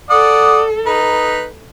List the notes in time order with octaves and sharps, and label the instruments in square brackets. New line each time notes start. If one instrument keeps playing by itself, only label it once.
[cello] A4 [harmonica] D5 F#5 D#6
[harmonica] D#4 B4